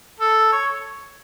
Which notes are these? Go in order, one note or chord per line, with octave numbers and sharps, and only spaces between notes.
A4
C#5